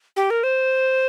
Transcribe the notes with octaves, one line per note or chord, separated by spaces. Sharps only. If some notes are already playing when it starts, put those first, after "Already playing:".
G4
A#4
C5